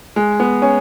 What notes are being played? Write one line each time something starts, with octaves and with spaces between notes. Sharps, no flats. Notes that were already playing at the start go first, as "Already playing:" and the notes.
G#3
B3
C#4